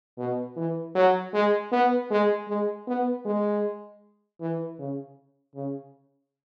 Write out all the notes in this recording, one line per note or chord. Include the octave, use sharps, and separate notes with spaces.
B2
E3
F#3
G#3
B3
G#3
G#3
B3
G#3
E3
C#3
C#3